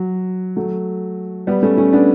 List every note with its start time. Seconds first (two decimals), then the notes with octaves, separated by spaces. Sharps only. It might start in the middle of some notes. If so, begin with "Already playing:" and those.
Already playing: F#3
0.56 F#3 A3
1.47 G3 B3
1.63 A3 C#4
1.77 A3 C#4
1.93 B3 D4